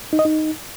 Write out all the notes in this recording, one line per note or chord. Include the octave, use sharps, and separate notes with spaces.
D#4
D#5
D#4